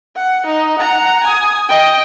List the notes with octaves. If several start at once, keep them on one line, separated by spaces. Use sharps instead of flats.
F#5
D#4
F#5 A#5
G#5 D#6
D#5 G5